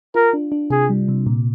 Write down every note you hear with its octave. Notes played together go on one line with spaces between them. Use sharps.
F4 A#4
D4
D4
C3 G#4
G3
C3
A#2